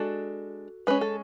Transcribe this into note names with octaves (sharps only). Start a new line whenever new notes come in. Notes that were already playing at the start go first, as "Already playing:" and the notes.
Already playing: G#3 D4 F#4 A4
G#3 C#4 B4
A4